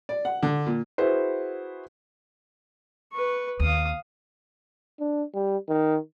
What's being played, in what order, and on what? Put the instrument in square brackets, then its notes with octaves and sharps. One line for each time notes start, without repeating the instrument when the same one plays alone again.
[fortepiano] D5
F#5
D3
A#2
[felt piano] E4 F#4 G#4 B4 C5
[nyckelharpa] B4 C#6
[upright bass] D#2 [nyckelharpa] F5 D#6
[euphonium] D4
G3
D#3